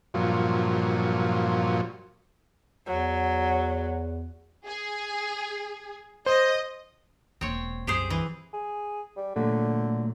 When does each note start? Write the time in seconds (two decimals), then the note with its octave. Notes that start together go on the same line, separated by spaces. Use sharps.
0.14 G2 A#2 F3 F#3
2.86 E2 F#3
4.66 G#4
6.26 C5 D#5
7.41 E1 A#3 C4 C#5
7.87 C2 F#2 G4 G#4 C5
8.10 E3
8.54 G#4
9.17 G3
9.36 A#2 D3 F#3 A3